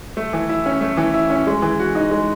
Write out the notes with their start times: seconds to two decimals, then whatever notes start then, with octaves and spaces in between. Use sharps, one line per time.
0.17 A3
0.33 E3
0.49 E4
0.66 C#4
0.81 A3
0.97 E3
1.14 E4
1.30 C#4
1.47 G#3
1.62 E3
1.79 F#4
1.95 D#4
2.11 G#3